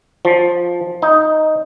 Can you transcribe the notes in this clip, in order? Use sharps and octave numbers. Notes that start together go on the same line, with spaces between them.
F3
D#4